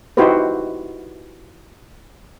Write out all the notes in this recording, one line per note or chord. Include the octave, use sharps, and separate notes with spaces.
D#4 E4 F#4 G4 B4 C5